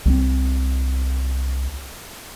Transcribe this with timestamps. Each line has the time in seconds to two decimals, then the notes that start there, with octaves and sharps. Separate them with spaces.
0.05 C2 G3 C4